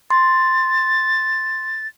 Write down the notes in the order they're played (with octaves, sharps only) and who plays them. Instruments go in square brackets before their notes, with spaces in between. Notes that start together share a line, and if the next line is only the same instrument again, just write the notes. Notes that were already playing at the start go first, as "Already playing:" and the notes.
[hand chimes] C6 [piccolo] A6